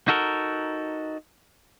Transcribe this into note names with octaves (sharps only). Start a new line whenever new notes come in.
D#4 F#4 A4 A#4